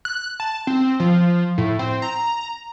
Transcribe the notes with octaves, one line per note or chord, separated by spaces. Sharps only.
F#6
A5
C4
F3
A2
C4
A#5